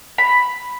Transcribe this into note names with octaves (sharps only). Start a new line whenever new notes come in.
B5